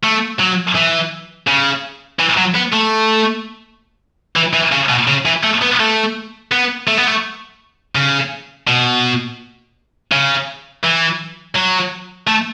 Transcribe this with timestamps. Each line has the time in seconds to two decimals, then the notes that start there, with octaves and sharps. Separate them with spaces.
0.03 A3
0.40 F#3
0.76 E3
1.47 C#3
2.20 E3
2.38 F#3
2.55 B3
2.73 A3
4.36 E3
4.54 E3
4.72 C#3
4.89 B2
5.07 C#3
5.25 E3
5.43 A3
5.62 B3
5.80 A3
6.52 B3
6.88 A3
6.98 B3
7.07 A3
7.95 C#3
8.67 B2
10.12 C#3
10.83 E3
11.56 F#3
12.28 A3